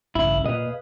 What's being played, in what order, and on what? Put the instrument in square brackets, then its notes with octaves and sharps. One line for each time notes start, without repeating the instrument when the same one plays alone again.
[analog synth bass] A1 [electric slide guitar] G2 C#3 [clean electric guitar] E4
[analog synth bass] A#2 [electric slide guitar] G#4 B4 F5 [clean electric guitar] D#5